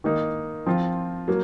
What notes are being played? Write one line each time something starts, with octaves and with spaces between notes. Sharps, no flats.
D#3 A#3 D#4
F3 C4 F4
F#3 A#3